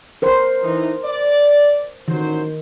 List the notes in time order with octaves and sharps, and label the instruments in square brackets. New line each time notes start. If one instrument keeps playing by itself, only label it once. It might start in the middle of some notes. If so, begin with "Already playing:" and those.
[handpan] A#4 C5
[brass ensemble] E3 D#4
D5
[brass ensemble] A1 F#3 C5 [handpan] D#3